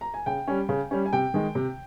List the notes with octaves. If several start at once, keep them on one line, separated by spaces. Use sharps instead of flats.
A#5
G#5
C#3 G5
G3 C#4
C#3
G3 C#4
G#5
C3 G5
D#3 G#3
C3